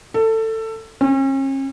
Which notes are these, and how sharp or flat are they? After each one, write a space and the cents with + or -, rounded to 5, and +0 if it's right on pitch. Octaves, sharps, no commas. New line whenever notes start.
A4 +20
C#4 -40